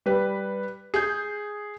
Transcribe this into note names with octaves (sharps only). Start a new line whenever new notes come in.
G3 B4
G#4 G6